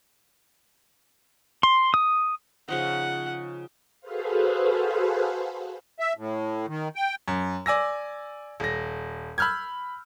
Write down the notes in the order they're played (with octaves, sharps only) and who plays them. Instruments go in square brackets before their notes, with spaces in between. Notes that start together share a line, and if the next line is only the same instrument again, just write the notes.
[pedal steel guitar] C6
D#6
[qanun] C#3 F3 D#4 [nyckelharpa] F#5
[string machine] F#4 G#4 A4 B4 C5 F5
[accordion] E5
A2
D#3
G5
[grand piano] F#2
D5 G#5 E6 A#6
D#1 A#6
B5 E6 F6 G6 G#6